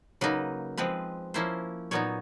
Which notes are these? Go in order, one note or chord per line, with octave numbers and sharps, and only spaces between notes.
C#3 F#3 A#3 D#4 B4
F3 G#3 C4 B4
F3 A#3 C#4 E4 C5
A#2 F#3 B3 D#4 C#5